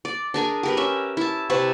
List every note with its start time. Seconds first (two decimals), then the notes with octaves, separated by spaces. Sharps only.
0.05 D5
0.34 D4 G#4 A#4 G#5
0.63 G4 A#4 B4
0.77 C#4 E5
1.17 E4 A5
1.50 C3 B4 C#5 A5